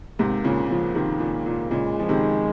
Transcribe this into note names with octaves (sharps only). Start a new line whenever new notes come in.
G#2 C3 A#3
A#2 C#3
C#3 F3
C3 D#3
A#2
A#2
A#2 C#3 G#3
F3
C3 D#3